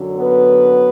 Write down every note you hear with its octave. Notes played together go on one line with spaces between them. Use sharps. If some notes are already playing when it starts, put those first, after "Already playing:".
Already playing: F#2 D3 F#3
B3 B4